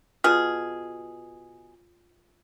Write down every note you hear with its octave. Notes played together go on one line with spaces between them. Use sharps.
B2 F4 G#4